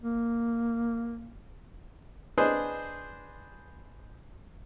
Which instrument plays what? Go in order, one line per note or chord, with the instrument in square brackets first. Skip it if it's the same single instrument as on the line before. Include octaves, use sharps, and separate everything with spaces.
[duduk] A#3
[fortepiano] D4 G#4 B4 C5 D#5